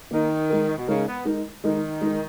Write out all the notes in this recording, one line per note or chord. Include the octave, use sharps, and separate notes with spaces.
D#3 A#3 D#4 A#4
G#3 D#4 A#4
B2
C#3 G#3 D#4 A#4
B3
G#3 D#4 A#4
D#3 G#3 D#4 A#4
G#3 D#4 A#4